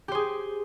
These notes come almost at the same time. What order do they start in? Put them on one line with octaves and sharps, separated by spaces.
G4 C5 G#4